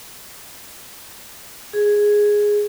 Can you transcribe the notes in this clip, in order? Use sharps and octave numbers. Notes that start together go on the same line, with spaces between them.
G#4